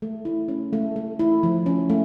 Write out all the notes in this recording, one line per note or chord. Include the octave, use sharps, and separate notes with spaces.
A3
E4
C#4
A3
A3
E4
F3
C#4
A3